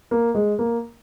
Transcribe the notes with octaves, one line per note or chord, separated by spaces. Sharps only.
A#3
G#3
A#3